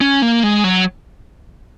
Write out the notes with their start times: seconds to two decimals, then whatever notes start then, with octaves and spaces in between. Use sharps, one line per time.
0.01 C#4
0.22 A#3
0.43 G#3
0.64 F#3